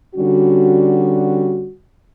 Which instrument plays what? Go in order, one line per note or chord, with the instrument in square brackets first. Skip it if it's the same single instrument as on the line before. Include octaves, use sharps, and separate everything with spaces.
[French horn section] D3 G3 C#4 F#4